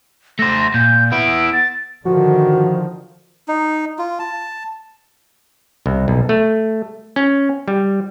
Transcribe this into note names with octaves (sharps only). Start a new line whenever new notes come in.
A3 C5 A#6
A#2 G6
B3 E4 D7
A6
D3 D#3 F3 F#4
D#4
F4
A5
C2
B1
A3
C#4
G3